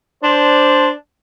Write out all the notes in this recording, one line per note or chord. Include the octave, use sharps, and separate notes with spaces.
D4 C5